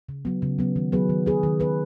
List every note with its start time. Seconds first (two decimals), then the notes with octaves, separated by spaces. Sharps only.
0.09 C#3
0.25 F#3 B3
0.42 C#3
0.59 F#3 B3
0.76 D#3
0.92 F#3 B3 G#4 B4
1.09 D#3
1.26 F#3 B3 G#4 B4
1.43 D#3
1.60 B3 G#4 B4